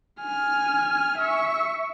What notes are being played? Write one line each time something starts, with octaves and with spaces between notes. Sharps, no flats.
G#5 F6
E5 C#6